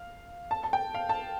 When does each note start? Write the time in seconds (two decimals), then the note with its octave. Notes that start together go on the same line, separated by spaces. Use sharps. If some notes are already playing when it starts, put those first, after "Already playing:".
Already playing: F5
0.51 A5
0.64 A5
0.73 G5
0.95 F5
1.09 A5